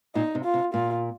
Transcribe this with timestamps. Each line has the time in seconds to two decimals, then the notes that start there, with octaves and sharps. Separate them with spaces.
0.15 A#2 D#4
0.35 C3
0.44 F4
0.54 C3
0.73 A#2 F4